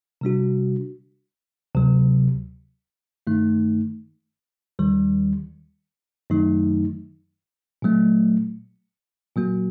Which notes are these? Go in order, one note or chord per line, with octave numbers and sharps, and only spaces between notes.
C3 G3 D4 F#4
D2 C3 F#3
G2 D#3 A3 D#4
D#2 D#3 G3
F#2 D#3 F#3 A3 D#4
A#2 F#3 A3
A#2 F#3 A#3 F#4